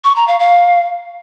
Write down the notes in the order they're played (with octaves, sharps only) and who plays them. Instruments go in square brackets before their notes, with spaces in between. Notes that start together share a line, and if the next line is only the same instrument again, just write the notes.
[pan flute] C#6
A#5
F5
F5